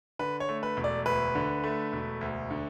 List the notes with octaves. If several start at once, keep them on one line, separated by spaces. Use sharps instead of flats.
D3 B4
C#5
A3
B4
E1
D5
D2 B4
D3
A3
E1
D2
D3